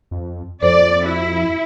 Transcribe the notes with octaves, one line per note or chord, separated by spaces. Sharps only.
F2
F2 F#4 A4 C5 D5
E4 F#4